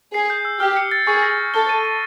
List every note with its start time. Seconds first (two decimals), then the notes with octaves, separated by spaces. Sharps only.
0.14 G#4 C7
0.30 G6
0.45 E6
0.60 G4 F6
0.77 C#7
0.91 A6
1.07 G#4 C#6
1.23 A#6
1.38 A#6
1.54 A4 G7
1.69 D#7
1.85 D#7